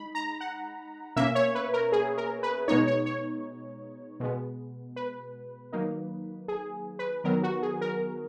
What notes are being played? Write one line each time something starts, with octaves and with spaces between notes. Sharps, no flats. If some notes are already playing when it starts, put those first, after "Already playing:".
Already playing: G#3 D#4 B5
A#5
F#5
B2 A#3 C#4 E5
C#5
B4
A#4
G#4
A#4
B4
B2 G#3 B3 D#4 C#5
C#5
C#5
B2 G#3 B3
B4
D#3 F#3 A#3 D#4
G#4
B4
D#3 F#3 B3 A#4
F#4
G#4
A#4